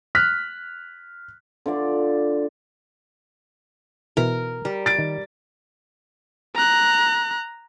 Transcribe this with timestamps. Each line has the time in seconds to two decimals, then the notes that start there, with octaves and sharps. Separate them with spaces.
0.15 F6 F#6 B6
1.66 D3 F4 D5
4.17 B2 E3 A#4
4.65 G3 A#4
4.86 A6 D7
4.99 D#3
6.55 A#5 F#6